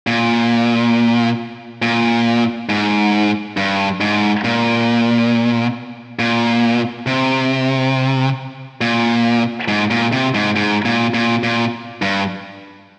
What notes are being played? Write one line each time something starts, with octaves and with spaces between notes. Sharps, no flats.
A#2
A#2
G#2
G2
G#2
A#2
A#2
C3
A#2
G#2
A#2
C3
G#2
G#2
A#2
A#2
A#2
G2